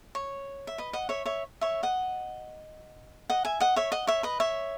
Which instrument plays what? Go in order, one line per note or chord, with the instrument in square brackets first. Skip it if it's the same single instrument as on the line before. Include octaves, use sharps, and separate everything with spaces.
[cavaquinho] C#5
E5
B4 D#5
D#5 F#5
C#5 E5
C#5 E5
C#5 E5
D#5 F#5
D#5 F#5
E5 G#5
D#5 F#5
C#5 E5
D#5 F#5
C#5 E5
B4 D#5
C#5 E5